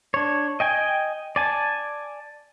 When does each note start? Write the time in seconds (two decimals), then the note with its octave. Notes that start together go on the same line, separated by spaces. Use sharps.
0.14 D4 C#5
0.60 D#5 G5 G#5
1.36 D5 G#5 A5